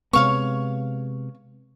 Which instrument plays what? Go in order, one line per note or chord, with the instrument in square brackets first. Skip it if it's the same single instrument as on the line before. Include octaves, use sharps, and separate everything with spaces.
[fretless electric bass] C3 G#3 B3 [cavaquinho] C#5 F5 C#6